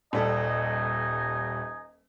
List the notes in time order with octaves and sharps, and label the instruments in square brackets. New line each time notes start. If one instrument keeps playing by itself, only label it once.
[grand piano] D#1 G3 A4 [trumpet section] D#4 D#5 G#5